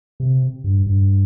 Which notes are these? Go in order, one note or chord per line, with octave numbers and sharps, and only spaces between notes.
C3
G2
G2